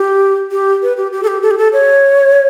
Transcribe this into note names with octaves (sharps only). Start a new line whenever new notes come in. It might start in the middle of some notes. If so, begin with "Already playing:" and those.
Already playing: G4
G4
B4
G4
G4
A4
G4
A4
G4
A4
C#5